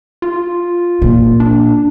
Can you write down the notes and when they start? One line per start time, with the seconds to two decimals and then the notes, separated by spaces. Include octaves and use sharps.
0.22 F4
1.02 A#2
1.40 D4